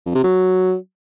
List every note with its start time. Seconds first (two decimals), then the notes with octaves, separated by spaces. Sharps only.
0.06 F2
0.15 C3
0.24 F#3